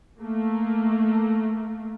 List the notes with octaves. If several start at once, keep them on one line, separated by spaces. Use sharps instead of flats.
A3 A#3